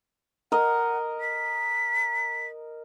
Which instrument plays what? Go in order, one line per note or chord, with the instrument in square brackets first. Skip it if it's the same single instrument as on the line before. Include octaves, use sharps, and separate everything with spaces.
[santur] A#4 D#5 [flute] F#5
[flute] B6